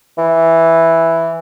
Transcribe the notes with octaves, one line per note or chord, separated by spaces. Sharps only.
E3